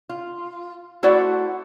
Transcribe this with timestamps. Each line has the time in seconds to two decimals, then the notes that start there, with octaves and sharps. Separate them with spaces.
0.09 F4
1.03 A3 E4 F#4 C5 D5 F#5